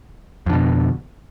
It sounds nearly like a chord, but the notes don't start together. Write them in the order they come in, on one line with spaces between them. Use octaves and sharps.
F2 D3 B2